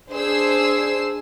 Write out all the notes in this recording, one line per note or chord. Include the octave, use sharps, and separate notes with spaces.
D4 G#4 C5 E6 C7